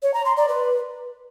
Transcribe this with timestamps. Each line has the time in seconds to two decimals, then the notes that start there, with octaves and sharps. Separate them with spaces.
0.02 C#5
0.14 A#5
0.25 C6
0.37 D5
0.48 B4